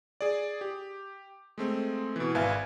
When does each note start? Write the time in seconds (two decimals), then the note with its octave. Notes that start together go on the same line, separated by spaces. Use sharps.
0.21 G#4 D5
0.61 G4
1.58 G#3 A3 C4
2.16 B2 E3
2.35 G#1 B4 E5 F5 G#5 G#6